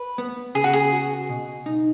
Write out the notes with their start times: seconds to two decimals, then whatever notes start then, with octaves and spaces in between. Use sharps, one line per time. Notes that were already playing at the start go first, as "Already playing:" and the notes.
Already playing: B4
0.18 B3
0.55 C#3 G#4
0.64 F#4
0.73 G#4
0.92 F#4
1.29 B2
1.66 D#4